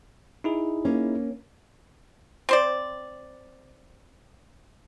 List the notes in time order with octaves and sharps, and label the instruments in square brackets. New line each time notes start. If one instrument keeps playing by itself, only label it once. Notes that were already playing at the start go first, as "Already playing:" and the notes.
[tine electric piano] D#4 E4 G#4
[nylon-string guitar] A#3 C#4
[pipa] C4 C5 D5